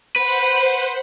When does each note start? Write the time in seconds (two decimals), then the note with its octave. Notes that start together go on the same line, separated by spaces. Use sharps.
0.16 B4 C5 F#5 B5